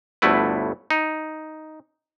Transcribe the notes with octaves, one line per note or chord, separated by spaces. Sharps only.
G1 D2 A3 E4 B4
D#4